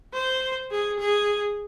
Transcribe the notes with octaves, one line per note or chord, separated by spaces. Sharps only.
C5
G#4
G#4